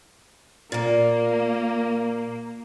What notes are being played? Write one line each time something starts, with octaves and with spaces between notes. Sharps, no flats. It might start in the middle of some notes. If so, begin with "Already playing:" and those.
A#2 A#3 A#4